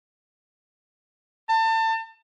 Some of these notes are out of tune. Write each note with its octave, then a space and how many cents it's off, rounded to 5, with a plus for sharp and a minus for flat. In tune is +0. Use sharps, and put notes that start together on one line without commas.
A5 +30